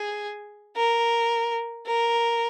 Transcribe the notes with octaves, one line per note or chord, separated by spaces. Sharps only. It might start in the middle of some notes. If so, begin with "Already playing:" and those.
Already playing: G#4
A#4
A#4